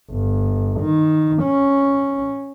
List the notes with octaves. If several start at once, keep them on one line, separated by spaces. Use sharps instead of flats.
G1
D#3
C#4